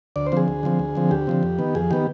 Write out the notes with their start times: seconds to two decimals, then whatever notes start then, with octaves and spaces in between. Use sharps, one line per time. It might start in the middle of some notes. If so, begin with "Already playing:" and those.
0.16 D2 D5
0.27 C5
0.32 D3 F3 C4 G#4
0.48 D2
0.63 D3 F3 C4
0.79 D2
0.95 D3 F3 C4
1.11 D2 G4
1.27 D3 F3 C4
1.43 F2
1.59 D#3 B3
1.75 F2 G#4
1.91 D#3 B3 G4